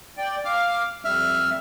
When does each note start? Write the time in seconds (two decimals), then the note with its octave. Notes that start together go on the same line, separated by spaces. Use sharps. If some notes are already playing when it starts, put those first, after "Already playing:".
0.18 D5 G5
0.45 F5 D6 F6
1.05 F2 G3 E5 F6